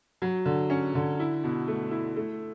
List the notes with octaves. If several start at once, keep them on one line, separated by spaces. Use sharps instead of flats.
F#3
D3
C#4
D3
E4
B2
A3
E4
A3